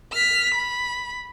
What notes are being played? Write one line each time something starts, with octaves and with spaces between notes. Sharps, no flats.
F6 B6
B5